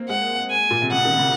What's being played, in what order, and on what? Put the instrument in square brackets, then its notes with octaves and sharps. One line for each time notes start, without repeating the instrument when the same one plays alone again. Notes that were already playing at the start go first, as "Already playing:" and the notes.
Already playing: [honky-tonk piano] A#3 C4
[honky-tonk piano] G#3 [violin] F#5
[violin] G#5
[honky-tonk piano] A#2
C3
[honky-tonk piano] C#3 [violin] F#5
[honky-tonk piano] D#3
C#3